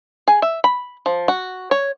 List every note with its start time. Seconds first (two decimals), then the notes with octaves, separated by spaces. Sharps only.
0.28 G#4
0.42 E5
0.64 B5
1.06 F3
1.28 F#4
1.71 C#5